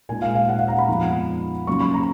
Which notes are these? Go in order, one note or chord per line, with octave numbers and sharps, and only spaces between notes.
A#2 G#3 D#4 G#5
F5
F5
F#5
F5
A#5
B5
F2 F3 G#3 B3 D#4
C#3 F#3 A#3 D#4 C#6
B5
A#5